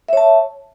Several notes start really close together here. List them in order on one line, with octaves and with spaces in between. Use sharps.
E5 C#5 A5